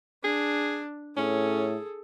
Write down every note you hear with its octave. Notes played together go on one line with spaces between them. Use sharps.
D4 G#4
A2 C#4 G#4 A4